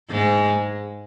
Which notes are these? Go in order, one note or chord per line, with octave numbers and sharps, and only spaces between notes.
G#2 G#3